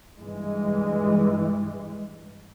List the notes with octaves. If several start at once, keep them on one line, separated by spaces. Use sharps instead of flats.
G2 E3 G#3